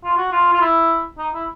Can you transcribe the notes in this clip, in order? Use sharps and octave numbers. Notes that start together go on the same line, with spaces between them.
F4
F#4
F4
F4
E4
D#4
E4